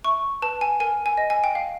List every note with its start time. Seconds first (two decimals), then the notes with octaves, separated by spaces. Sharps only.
0.04 E5 C#6
0.42 B4 A5
0.61 G#5
0.80 A#4 G#5
1.06 G#5
1.18 D#5
1.30 G#5
1.44 G5
1.55 F5